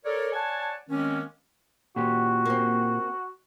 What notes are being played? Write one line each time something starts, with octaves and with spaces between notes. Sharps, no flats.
A4 A#4 C#5 D5
C#5 D5 F#5 G#5 A5
D#3 G#3 A#3 C4 C#4
A#2 F#4 G4
A#3 C4